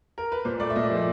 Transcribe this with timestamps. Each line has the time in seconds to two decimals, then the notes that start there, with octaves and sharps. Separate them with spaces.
0.18 A#4
0.32 B4
0.45 A#2 C5
0.60 A3 D5
0.70 E5
0.76 A#2 D#5
0.90 F3